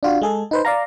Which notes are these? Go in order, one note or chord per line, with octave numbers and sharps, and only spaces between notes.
D4 F4 F#4
G#3 G#4 A4
D#4 B4 C5
D5 F5 A#5